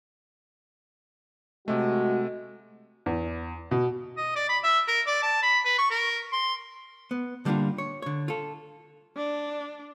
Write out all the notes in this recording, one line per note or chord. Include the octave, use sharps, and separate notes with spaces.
C3 G#3 A3 F#4
E2
B2
D#5
D5
B5
E5
A#4
D5
A5
B5
B4
C#6
A#4
C6
B3
D3 G3 A#3 C#4 D4 F4
C#5
D3 C#5
F4 A4
D4